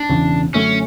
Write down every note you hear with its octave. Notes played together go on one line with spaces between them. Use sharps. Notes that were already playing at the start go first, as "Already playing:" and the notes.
Already playing: D4
E1 E2 C#3
F#2 D3 A3 C#4